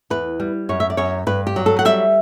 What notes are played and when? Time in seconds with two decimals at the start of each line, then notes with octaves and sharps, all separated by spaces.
0.10 E2 B4
0.40 G3
0.69 F#2 C#5
0.80 E5
0.90 D5
0.97 F#2 C#5
1.27 G2 B4
1.47 G4
1.56 F#3
1.66 A4
1.79 F#5
1.85 G3 E5